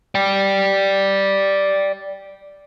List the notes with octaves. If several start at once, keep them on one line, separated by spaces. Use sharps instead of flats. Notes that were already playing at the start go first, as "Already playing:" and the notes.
D5 G5